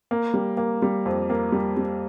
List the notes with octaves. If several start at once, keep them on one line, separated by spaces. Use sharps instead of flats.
A#3
G3
A#3
G3
F2
A#3
G3
G3